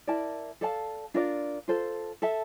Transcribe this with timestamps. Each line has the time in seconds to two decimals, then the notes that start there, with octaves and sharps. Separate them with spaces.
0.07 E4 A#4 D5 A5
0.61 A4 D5 F5 A5
1.14 D4 F4 A#4 D5
1.68 F4 A4 C5
2.22 A4 E5 A5